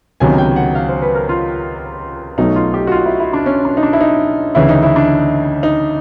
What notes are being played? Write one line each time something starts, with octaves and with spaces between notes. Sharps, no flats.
C#2 C3 D#3 F#3 B3 G#5
G5
F#5
F5
C5
B4
A#4
F4
B1 B2 F#3 A3 D#4
F4
G4
F#4
F4
E4
E4
D4
C#4
D4
D#4
D4
E4
D#4
D2 C#3 E3 E4
D#4
E4
D4
D#4